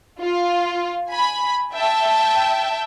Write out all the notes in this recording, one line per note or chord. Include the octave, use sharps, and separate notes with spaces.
F4
G#5 B5
E5 G5 A5